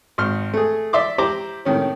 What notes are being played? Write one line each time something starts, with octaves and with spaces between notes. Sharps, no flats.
G#1 C6 F6
A3 G#4
D5 E5 C6 D6
E4 G4 C5 A#5 D6
A2 C3 D#3 C#4